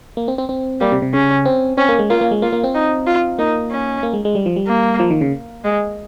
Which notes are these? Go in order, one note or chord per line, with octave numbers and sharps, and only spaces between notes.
A#3
C4
C4
C4
G3 A#3
C3
C3
C#3 C#4
C4
C4 C#4
A#3
G#3
A#3 F4
A#3
G#3
A#3 F4
A#3
C4
D#4
F4
A#3 D#4
C#4
A#3
G#3
G#3
G3
F3
G3
A#3
F3
D#3
C#3
G#3